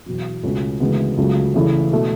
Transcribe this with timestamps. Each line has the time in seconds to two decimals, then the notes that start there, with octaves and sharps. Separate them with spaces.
0.06 E2 B2 F#3
0.43 C#2 B2 A3 C#4 F#4
0.80 D2 C#3 E3 G#3 B3
1.17 C#2 C#3 F#3 A3
1.54 E2 C#3 E3 A3 E4
1.92 B2 A3